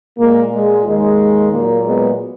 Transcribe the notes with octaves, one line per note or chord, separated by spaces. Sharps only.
A#2 G#3 A#3
G#3
D#2 D#3 G#3
A#2 F#3 A#3
G#3 B3